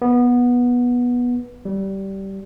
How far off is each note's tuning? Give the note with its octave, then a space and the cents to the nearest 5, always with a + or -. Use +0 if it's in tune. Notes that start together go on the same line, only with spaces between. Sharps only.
B3 -15
G3 -15